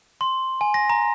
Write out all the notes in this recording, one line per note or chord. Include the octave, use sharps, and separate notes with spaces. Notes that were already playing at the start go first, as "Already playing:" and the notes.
C6
G#5
A#6
A#5